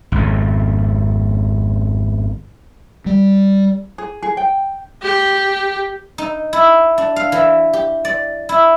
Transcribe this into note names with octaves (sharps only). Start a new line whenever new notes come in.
G#1 F2
G3
G#4
G#4
G5
G4
D#4
E4
D4
F5
E3
G4
D5
E4